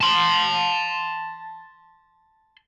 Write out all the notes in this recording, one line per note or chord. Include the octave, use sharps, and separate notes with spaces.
A5 C6